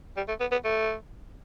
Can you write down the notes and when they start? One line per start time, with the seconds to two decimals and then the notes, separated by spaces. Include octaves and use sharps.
0.17 G3
0.28 A3
0.41 B3
0.52 B3
0.65 A3